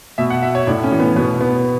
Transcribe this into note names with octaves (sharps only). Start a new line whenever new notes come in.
B2 E5
F#5
E5
C#5
A2 D4
C#4
E3
B3
B2 B3
B3